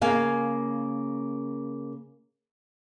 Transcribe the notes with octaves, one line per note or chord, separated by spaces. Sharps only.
C#3 A#3 F5 G#5